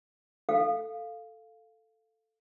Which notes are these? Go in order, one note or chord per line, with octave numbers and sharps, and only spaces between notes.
A4 F5